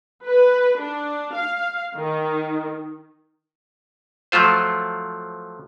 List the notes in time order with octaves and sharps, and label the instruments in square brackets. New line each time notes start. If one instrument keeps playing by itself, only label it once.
[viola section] B4
D4
F5
D#3
[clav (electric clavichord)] F3 F#3 A3 F4 C5